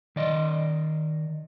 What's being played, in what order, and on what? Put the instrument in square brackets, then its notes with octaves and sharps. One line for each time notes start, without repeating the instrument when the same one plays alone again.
[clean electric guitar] D#3 D5 D#5